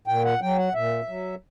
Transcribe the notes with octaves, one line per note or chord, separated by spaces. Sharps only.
A#2 G5
F#5
F#3 G5
F#5
A#2 E5
F#3